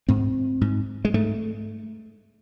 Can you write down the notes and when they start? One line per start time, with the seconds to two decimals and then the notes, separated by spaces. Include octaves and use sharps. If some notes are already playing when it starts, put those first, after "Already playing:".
0.08 G#2 C4
0.61 G#2
1.05 G#3
1.14 G#2 A3